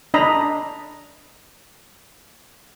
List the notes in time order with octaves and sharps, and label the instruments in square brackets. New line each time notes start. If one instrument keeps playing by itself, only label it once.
[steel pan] D4 D#5 A#5 B5